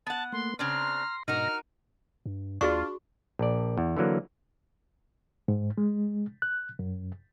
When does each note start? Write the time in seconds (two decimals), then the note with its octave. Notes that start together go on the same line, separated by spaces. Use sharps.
0.07 B3 F#5 A5
0.32 A3 A#3 C6
0.59 C#3 C4 D4 A#5 C6 F6
1.28 G#2 B2 D#4 F#4 A#4 F6 A#6
2.26 G2
2.61 D#2 D4 F4 F#4 G#4 C#6
3.39 A#1 D5
3.78 E2
3.97 D3 E3 F#3 A#3
5.48 G#2
5.78 G#3
6.42 F#6
6.79 F#2